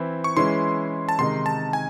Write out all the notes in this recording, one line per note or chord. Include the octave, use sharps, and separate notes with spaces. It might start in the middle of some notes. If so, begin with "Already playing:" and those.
Already playing: E3 C4 E4
C#6
E3 G#3 C#4 E4 C6
A5
C3 D#3 G#3 D#4 C6
A5
G#5